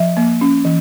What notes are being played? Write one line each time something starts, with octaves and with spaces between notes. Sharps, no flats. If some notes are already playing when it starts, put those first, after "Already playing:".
Already playing: F3 E5
A#3
C#4
E3